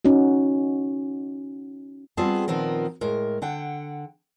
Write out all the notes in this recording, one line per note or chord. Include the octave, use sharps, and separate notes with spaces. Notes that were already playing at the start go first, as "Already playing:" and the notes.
C#4 D#4 F#4
G3 B3 C4 F4 G#4 A5
A#2 D#3 F3 B3 C4 A#4
A2 G#3 A#4
D3 F#5 G5